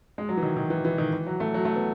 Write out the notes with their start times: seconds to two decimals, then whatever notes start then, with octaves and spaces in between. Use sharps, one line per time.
0.18 G#3
0.29 F#3
0.37 E3
0.43 D#3
0.57 D#3
0.70 E3
0.85 E3
0.98 D#3
1.13 E3
1.26 F#3
1.40 A3
1.54 F#3
1.65 A3
1.76 B3